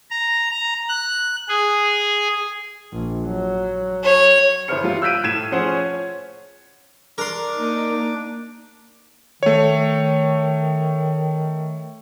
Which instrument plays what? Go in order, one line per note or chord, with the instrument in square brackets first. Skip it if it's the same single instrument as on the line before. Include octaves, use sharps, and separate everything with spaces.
[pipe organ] A#5
A#5
F#6
G#4
[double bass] A#1
F#3
[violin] C#5
[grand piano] G1 E4 B4 C5 F6 C#7
F#3 G3 F4
E6 F#6 G6 B6 D7 D#7
A2 G#6 D#7 E7
F3 C#4 G#4 C5 F#5
C#5
[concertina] D4 D6 [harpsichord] A#4 C6
[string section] A#3 D#4
[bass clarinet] D#3 [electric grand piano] A3 C#5